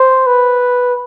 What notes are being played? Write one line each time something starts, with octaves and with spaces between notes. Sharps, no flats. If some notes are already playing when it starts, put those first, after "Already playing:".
Already playing: C5
B4